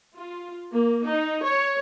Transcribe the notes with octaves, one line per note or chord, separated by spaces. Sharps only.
F4
A#3
D#4
C#5